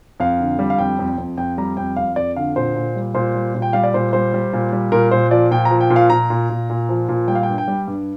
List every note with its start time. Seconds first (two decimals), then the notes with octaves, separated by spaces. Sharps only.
0.20 F2 F5
0.40 D3
0.59 G3
0.70 F5
0.78 F2 G5
0.99 F2
1.18 F2
1.37 F2 G5
1.58 G3 A#5
1.77 F2 G5
1.96 F2 F5
2.16 F2 D5
2.36 D3 F5
2.56 A#2 C5
2.75 A#2
2.96 G3
3.15 A#2 C5
3.35 G3
3.55 A#2
3.62 G5
3.73 G3 F5
3.84 D5
3.94 A#2 C5
4.13 G3 C5
4.34 G3
4.53 A#2
4.72 G3
4.92 A#2 A#4
5.11 A#2 C5
5.31 F3 D5
5.51 A#2 G5
5.65 A#5
5.71 F3
5.81 G5
5.90 A#2
5.96 F5
6.10 A#2 A#5
6.30 A#2
6.50 A#2
6.70 A#2
6.89 F3
7.09 A#2
7.28 G3 G5
7.35 F5
7.43 G5
7.48 G2
7.58 G5
7.68 G3
7.88 G2